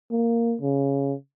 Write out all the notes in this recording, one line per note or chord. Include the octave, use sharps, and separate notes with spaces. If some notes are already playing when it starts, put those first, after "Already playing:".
A#3
C#3